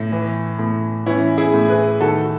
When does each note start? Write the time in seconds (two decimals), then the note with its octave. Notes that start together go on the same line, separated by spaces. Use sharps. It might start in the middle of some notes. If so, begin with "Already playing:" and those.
Already playing: A2
0.12 E3
0.59 A2
1.06 E3 C#4 E4
1.38 E4 G#4
1.54 A2
1.69 G#4 B4
2.01 D#3 F#4 A4